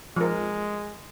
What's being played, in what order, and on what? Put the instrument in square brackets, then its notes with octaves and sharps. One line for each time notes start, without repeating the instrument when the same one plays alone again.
[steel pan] F3 A#4 [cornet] G#3